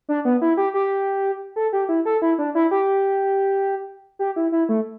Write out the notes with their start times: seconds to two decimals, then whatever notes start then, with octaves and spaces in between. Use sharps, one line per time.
0.09 D4
0.25 B3
0.42 E4
0.57 G4
0.74 G4
1.56 A4
1.73 G4
1.89 E4
2.06 A4
2.22 E4
2.38 D4
2.55 E4
2.71 G4
4.19 G4
4.36 E4
4.52 E4
4.69 A3